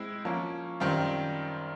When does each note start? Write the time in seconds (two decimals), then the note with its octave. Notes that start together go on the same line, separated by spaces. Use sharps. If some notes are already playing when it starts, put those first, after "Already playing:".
Already playing: G#3 C4 E4
0.25 F3 A#3 C#4
0.80 F#2 D#3 G3 C4 F4